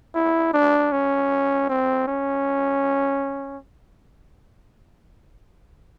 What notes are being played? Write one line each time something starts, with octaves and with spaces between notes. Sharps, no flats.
E4
D4
C#4
C4
C#4